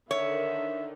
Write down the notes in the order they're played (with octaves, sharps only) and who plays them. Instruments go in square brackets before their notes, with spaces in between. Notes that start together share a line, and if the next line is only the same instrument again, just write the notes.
[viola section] D3 D#3 [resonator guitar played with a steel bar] C#5 [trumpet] E5